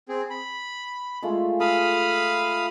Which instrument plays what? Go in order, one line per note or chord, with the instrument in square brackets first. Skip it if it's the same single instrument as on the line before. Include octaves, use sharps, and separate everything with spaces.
[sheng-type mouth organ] C4 G#4
B5
[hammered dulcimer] G#3 A3 F4
[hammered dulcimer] A4 [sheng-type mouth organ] F5 B5 D#6